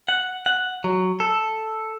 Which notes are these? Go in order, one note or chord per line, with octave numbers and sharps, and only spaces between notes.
F#5
F#5
F#3
A4